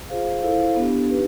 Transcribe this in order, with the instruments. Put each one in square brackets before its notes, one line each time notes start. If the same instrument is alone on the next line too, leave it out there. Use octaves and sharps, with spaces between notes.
[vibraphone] F4 G#4 C5 F5
E4 A4 C5 F5
B3 D4 G4
D#4 G4 B4